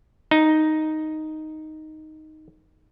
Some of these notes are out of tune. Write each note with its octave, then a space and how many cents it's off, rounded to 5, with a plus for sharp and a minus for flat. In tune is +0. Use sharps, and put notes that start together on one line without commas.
D#4 +0